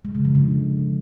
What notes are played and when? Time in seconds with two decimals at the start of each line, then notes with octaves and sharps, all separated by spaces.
0.05 G#3
0.15 C#3
0.25 F3
0.35 D3